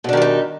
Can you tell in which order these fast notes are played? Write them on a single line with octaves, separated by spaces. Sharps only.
B2 D4 D#3 G3 D#4